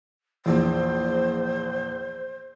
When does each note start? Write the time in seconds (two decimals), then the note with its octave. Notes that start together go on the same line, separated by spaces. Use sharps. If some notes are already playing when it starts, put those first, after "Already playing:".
0.46 A#1 E2 C5